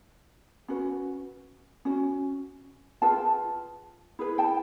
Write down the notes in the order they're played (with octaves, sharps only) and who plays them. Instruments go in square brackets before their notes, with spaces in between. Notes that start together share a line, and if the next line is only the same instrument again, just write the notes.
[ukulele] C#4 F#4 B4
C#4 F#4
F4 G#4 B4 G5 A5
E4 G#4 B4
G5 A5